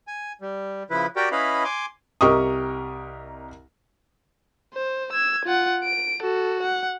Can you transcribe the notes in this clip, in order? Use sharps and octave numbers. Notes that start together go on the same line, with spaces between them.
G#5
G3
C#3 F3 E4 B4
F#4 G4 A#4 D5 G5
C#4 E4 B4 D#5 F5 B5
G#5 C6 D6
C2 G4 A#4 D#5 C#6 D#6
C5
E6 G#6
F4 F#5
D7
F#4 A4
F#5